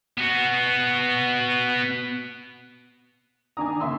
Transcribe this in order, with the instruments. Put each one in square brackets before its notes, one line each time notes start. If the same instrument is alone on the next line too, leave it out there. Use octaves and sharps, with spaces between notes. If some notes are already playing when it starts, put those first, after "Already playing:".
[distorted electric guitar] B3 F#4
[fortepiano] D#3 D4 A#5 [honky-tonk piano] G#5 D6 D#6
[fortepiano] C#3 A#3 [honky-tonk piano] E5 C6 E6